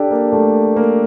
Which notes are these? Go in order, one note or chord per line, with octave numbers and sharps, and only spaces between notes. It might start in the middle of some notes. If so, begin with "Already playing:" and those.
Already playing: D4 G4 A4
A#3
A3
A#3